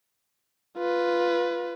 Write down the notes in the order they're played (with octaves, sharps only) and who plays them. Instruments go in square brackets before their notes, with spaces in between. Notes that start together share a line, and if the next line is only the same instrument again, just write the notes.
[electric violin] F4 B4